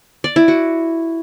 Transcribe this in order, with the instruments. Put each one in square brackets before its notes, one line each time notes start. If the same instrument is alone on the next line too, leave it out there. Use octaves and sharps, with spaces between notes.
[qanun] D5
E4
F#4